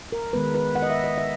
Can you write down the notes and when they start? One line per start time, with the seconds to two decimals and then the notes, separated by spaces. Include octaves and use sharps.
0.12 A#4
0.33 D#3 G#3 B3 B4
0.55 B4
0.75 F#5
0.82 D#5
0.90 E5
1.04 D#5
1.18 E5